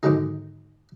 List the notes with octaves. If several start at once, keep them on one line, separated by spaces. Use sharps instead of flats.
G#2 D3 D#3 F#3 G#3 D#4